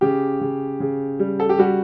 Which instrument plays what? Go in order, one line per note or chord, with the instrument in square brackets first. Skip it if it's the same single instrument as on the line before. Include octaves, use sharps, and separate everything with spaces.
[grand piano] C#3 G4
C#3
C#3
G3
A4
G4
G3 F#4